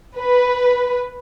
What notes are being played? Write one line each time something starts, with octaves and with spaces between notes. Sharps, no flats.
B4